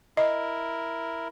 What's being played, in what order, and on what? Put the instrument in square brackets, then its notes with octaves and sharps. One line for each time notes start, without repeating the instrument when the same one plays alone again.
[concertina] E4 A#4 [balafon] D#5